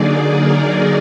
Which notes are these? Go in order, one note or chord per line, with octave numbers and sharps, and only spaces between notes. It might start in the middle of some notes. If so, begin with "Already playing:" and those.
Already playing: D3 F#3 A#3 D#4 G#4 D5
A#4